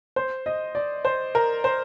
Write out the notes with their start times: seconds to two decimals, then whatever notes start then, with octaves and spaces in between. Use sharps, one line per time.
0.16 C5
0.46 D#5
0.75 D5
1.05 C5
1.35 A#4
1.64 C5